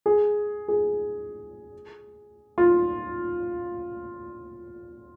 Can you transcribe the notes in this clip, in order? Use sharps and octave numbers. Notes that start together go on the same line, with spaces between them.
G#4
G#4
F4